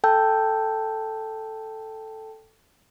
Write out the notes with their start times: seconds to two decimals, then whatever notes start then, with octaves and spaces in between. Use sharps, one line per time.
0.04 A4 G5 A5 E6 G6